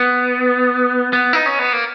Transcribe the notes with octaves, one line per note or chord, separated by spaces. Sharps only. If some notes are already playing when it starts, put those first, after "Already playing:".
Already playing: B3
B3
D#4
C#4
B3
A#3